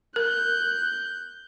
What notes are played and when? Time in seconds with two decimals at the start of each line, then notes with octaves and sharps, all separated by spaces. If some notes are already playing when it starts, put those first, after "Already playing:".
0.16 A#4 F#6 G6